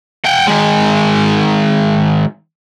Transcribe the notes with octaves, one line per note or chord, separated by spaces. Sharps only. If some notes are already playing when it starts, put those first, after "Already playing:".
F#5 G5
D#3 G#3